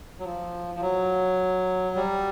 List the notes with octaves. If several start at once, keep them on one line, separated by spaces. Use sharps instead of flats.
F#3
F3
F3
F#3
G3